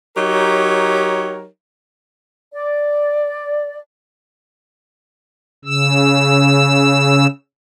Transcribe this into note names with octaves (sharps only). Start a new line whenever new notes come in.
F#3 D#4 G4 A#4 C#5
D5
C#3 E6